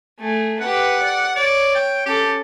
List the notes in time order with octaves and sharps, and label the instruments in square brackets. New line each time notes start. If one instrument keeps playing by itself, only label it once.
[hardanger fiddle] A3 G#4
[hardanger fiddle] G4 B4 [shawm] F#5
[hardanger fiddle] D5
[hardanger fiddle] C#5 [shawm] D5
[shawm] G5
[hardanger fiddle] C#4 A4 [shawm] G4